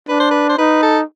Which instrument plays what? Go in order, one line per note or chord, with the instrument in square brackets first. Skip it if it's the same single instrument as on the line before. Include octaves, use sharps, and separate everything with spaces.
[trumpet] D4 [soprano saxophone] B4
[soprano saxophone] C5
B4
C5
[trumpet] D#4 [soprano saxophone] B4
[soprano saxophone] A4